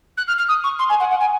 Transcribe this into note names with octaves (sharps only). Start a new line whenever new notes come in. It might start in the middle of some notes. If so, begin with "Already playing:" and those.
F#6
F6
F6
D#6
C#6
C6
G#5
F#5
F#5
G#5